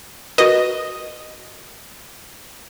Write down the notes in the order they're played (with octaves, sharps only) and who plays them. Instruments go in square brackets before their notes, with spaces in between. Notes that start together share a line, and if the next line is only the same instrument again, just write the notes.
[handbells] F#4 A#4 B4 [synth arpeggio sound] D#5